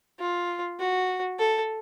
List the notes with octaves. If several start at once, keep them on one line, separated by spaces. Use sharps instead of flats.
F4
F#4
A4